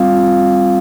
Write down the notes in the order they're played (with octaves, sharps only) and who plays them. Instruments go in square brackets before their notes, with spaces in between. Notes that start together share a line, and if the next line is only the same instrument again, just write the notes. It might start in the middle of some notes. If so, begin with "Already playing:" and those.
Already playing: [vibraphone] G3 C4 F4 F5